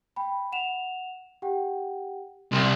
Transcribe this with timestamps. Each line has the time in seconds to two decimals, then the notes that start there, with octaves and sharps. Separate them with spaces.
0.16 G5 B5
0.52 F#5 E7 F7
1.42 G4 F#5 G5
2.52 C2 C6 F#7